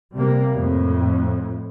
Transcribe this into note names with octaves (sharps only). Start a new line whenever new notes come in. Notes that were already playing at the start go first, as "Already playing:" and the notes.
C3 G3 A#3
F2 A2